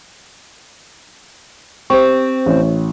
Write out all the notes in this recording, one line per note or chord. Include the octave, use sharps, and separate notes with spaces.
C4 G4 C5 C#6
A1